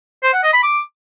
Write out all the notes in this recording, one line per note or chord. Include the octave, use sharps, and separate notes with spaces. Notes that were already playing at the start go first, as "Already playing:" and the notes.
C5
F#5
D#5
B5
D6